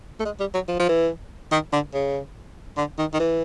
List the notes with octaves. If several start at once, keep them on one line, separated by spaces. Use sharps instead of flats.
A3
G#3
G3
F#3
F3
F3
E3
D#3
D3
C#3
D3
D#3
D#3
E3